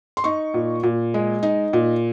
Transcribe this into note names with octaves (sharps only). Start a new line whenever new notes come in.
C6
D#4 C#6
A#2
A#2
G#3
D#4
A#2